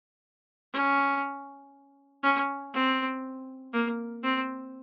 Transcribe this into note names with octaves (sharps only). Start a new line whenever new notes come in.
C#4
C#4
C4
A#3
C4